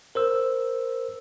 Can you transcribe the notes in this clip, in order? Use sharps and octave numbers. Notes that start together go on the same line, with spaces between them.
A#4 C5 E6